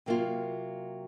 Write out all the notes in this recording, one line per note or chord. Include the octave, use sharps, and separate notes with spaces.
C3 F#3 A#3 F4